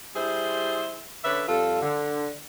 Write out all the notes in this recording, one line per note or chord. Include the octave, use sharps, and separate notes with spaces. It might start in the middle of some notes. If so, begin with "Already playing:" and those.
G3 E4 G#4 C5
D3 C#4 B4 D5 E5
F2 G3 F4 A4
D3